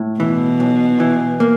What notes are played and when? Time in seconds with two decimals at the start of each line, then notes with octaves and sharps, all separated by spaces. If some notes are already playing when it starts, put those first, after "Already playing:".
Already playing: A2
0.20 B2 E3
0.60 B1
1.00 E3
1.40 A#3